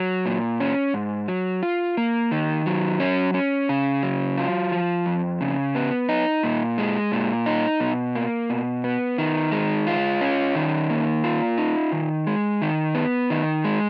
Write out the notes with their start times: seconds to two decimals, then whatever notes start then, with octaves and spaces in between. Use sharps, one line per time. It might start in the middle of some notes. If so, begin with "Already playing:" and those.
Already playing: F#3
0.26 A#2
0.60 C#4
0.94 G#2
1.28 F#3
1.63 F4
1.97 A#3
2.31 D#3
2.66 F#3
3.00 C#4
3.34 C#4
3.69 C#3
4.03 F#3
4.38 F4
4.72 F3
5.06 F2
5.41 C#3
5.75 B3
6.09 D#4
6.43 A#2
6.78 G#3
7.12 A#2
7.46 D#4
7.80 B2
8.15 A#3
8.50 B2
8.84 B3
9.18 D#3
9.52 G#3
9.87 F4
10.21 C#4
10.55 D#3
10.90 A#3
11.24 F4
11.58 D#4
11.92 D#3
12.27 G#3
12.62 D#3
12.95 B3
13.30 D#3
13.64 G#3